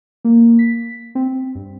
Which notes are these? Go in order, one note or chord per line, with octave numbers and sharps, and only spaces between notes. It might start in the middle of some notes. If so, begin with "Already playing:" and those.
A#3
B6
C4
G2